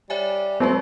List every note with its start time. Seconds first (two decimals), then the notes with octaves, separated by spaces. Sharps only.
0.10 G3 C#5 E5 G#5
0.60 F#3 G#3 A3 C4 F#4